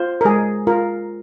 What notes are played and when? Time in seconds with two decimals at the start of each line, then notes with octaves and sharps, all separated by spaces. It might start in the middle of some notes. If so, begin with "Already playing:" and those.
Already playing: F4 C5
0.21 A#4
0.25 G#3 G#4
0.67 F4 A#4